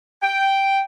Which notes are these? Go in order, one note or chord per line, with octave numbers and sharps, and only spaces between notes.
G5